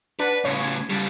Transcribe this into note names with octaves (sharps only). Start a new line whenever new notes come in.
D4 B4 F#5 A5
A2 C#3 C#5
G#6
C#3 G3